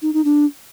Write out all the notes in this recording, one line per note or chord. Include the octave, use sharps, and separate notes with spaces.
D#4
D#4
D4